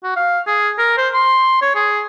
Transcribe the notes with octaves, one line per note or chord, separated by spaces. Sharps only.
F#4
F5
G#4
A#4
C5
C6
C#5
G#4